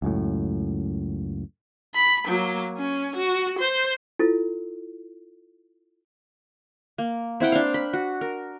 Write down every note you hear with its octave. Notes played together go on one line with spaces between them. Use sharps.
C#2 F#2 A2
B5
F#3 A#3
C#4
F#4
C5
E4 F4 A4
A#3
C4 E4 F#5 G5
D4 F5
B5
F#4
A#4